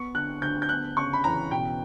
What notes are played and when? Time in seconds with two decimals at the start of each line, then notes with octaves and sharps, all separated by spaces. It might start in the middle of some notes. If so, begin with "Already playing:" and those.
Already playing: B3 C#6
0.14 D3 F#6
0.42 D2 G6
0.62 G6
0.69 B3 F#6
0.97 C#3 C#6
1.13 B5
1.24 E2 A#5
1.51 B2 G5